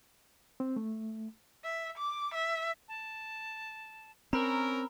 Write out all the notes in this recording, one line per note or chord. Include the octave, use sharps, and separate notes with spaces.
C4
A3
E5
D6
E5
A5
C4 C#4 A#4 A#5 B5 E6